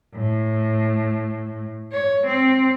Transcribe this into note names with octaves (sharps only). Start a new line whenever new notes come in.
A2
C#5
C4